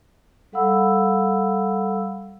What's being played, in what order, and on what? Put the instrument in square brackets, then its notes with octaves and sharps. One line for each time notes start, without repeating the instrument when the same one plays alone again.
[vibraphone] G3 A4 F5 F#5 B5 E6